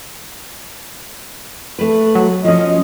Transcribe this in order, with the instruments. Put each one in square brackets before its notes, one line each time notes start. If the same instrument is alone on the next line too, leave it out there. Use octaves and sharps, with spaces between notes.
[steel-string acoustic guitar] A3 B4
[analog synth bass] F#3
[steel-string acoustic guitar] F3 C#4 [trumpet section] D#5